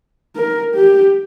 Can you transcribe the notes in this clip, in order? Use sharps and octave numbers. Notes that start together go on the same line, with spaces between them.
A#4
G4